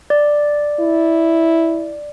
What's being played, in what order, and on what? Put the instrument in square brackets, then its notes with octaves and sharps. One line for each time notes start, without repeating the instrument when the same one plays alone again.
[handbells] D5
[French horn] E4